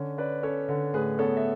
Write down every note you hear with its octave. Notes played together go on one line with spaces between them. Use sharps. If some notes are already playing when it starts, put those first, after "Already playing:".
Already playing: D3 C#4
C#4 B4 D5
C#4 A4 C#5
D3
A2 G#4 B4
B3 A4 C#5
E5